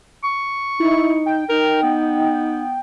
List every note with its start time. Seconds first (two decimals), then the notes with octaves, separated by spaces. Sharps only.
0.24 C#6
0.80 D#4 E4
1.26 G5
1.49 D#4 A#4
1.83 B3